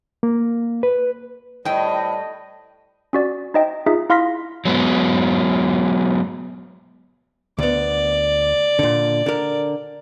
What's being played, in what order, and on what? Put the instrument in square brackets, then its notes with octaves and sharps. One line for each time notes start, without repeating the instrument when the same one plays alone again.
[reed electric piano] A#3
B4
[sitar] A2 [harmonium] G3 [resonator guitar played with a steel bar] C5 G5 [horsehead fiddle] D#5
[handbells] C#4 F#4 D5
D#4 C5 D#5 E5 G5
D#4 F4 G#4 E5
E4 F5 C6 F6 A#6 B6
[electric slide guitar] F#3 G#3 B3
[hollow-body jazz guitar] D2 B3 [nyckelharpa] D5
[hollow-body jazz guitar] A#2 D3
D3 A#4